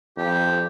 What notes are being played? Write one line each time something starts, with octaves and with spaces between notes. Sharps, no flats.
F2 G4